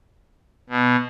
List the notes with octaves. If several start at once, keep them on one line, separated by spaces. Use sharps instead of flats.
B2